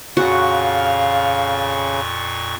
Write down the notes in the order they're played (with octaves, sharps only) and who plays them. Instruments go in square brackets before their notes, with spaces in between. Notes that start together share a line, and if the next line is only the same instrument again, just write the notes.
[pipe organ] F2 A#2 C#6 [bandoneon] C#3 [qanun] F#4 [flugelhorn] F5